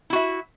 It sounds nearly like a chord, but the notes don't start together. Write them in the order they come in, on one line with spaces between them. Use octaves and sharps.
E4 F#4 E5